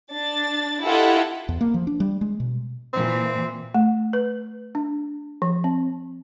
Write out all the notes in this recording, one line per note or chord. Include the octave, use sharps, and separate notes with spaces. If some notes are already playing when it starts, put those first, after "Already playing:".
D4 A6
E4 F4 G4 A4 D#5 F#5
E2
A#3
F3
D4
G3
G#3
B2
A#2 E3 C4
A3
B4
D4
F3
C4